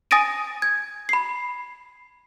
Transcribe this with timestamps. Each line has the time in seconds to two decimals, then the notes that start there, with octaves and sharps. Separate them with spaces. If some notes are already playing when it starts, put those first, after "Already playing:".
0.11 G#5 D#6 A6 A#6 D7 D#7
0.62 G#6
1.09 B5 C7